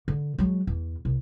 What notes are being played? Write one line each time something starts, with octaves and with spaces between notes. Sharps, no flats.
D3
F#3 G#3
E2
C2